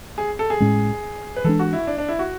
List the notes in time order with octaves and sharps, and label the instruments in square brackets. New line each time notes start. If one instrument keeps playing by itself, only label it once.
[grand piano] G#4
A4
G#4
[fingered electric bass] A2 G#3 C#4
[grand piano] B4
[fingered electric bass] E3 G#3 D4 [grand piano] A4
[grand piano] F#4
E4
D4
D4
E4
F#4